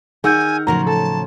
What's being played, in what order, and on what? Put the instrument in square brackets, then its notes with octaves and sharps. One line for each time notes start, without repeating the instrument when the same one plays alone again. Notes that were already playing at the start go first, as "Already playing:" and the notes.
[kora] D#3 [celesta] G#4 E6 G6 [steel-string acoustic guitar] A#4 F#5 [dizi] G#5
[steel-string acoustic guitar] A2 C#3 F3 [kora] F#3 [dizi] A#4 [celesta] A#5
[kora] A4 [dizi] A5